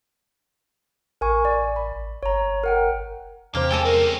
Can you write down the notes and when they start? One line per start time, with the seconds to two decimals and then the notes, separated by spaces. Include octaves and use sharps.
1.21 A1 A#4 G#5 C#6
1.45 D5
1.76 B5
2.23 G1 C#5 A#5
2.64 A#4 F#5 G5
3.55 E2 C3 A#3 G4 C5
3.71 A#2 G#3 A4 D#5 G5
3.85 C4 C#4 A#4